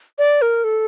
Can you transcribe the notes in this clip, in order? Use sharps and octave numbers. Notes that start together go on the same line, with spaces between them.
D5
A#4
A4